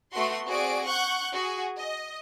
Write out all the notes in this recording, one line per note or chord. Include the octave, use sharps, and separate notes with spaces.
A3 B3 F#4 C6
C4 F#4 G#4 D5 D7
F#5 C#6 F#6 G6
F#4 G#4
D#5